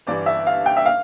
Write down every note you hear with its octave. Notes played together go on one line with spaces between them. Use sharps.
G1 G2 E3 D5
E5
F5
G5
E5
F5